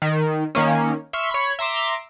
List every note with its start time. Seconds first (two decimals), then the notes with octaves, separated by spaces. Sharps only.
0.02 D#3
0.55 D#3 A#3 C#4
1.13 E5 C6 C#6 F6
1.31 C#5 B5
1.59 E5 A#5 C6 D6